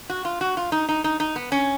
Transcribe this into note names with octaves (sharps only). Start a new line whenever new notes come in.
F#4
F4
F#4
F4
D#4
D#4
D#4
D#4
B3
C#4